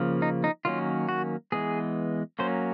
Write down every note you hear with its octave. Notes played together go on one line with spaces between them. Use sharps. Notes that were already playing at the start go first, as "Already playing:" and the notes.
Already playing: C#3 F3 A#3
D#4
D#4
D#3 F#3 A#3 C#4 F4
F#4
E3 G#3 B3 G#4
F#3 A#3 C#4 C5